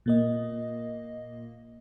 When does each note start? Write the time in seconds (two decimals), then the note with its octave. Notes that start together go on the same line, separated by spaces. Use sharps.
0.06 A#2 A#3 D#5